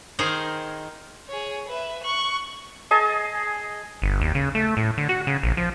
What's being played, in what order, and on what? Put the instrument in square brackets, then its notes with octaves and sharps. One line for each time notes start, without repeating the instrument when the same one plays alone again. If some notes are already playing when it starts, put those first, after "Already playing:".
[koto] D#3 D#4 G#4 A#4 C5 G#5
[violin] G#4 C#5
B4 E5
C#6 F#6
[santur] G#4 D#5 G#5 A5
[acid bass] G1
D#2
C#3
A3
A2
D3
F#4
C#3
A#1
F3